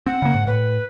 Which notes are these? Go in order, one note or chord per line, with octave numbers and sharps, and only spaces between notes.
C4 F#5
C#3 A#3
G#2
A2 B4